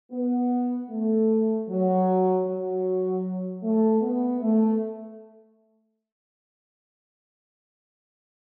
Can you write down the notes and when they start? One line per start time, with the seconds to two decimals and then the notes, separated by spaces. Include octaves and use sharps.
0.11 B3
0.89 A3
1.68 F#3
2.46 F#3
3.62 A3
4.02 B3
4.41 A3